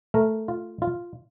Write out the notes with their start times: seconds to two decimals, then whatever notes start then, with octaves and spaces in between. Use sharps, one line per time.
0.14 A3 A#4
0.48 F4
0.82 F4